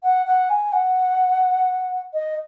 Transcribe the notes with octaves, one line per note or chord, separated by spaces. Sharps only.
F#5
F#5
G#5
F#5
D#5